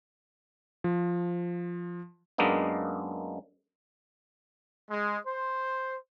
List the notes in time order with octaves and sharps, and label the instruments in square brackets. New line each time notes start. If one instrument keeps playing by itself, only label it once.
[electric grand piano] F3
[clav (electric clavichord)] F#2 G#3 A#3 B3 D4 D#4
[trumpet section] G#3
C5